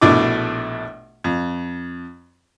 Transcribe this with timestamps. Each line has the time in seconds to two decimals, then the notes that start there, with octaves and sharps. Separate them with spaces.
0.01 A#1 B2 A3 D4 E4 D6
1.24 F2